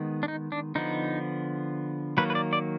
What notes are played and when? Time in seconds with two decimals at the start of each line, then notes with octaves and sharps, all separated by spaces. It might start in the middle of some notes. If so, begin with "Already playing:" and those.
Already playing: D#3 G#3 B3
0.23 D4
0.28 D#4
0.52 D4
0.75 D3 F3 B3 D#4
2.17 D#3 F#3 A#3 B4
2.30 B4
2.35 D5
2.53 D5